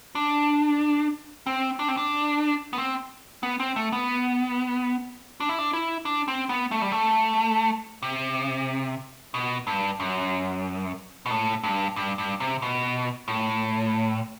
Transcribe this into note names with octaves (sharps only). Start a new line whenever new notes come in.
D4
C4
D4
C4
D4
B3
C4
B3
C4
A3
B3
D4
E4
D4
E4
D4
C4
B3
A3
G3
A3
C3
B2
G2
F#2
B2
A2
G2
G2
G2
C3
B2
A2